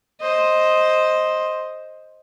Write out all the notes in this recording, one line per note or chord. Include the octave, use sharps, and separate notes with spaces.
C5 D#5